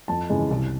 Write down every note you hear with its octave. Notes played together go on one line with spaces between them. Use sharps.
F2 A5
C#3 E3 G#3
C2